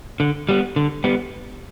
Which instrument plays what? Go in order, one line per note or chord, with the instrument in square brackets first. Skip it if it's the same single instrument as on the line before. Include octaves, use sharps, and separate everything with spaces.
[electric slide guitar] D3
G3 B3
D3
G3 B3